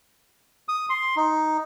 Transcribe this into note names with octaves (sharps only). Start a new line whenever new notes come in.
D#6
C6
D#4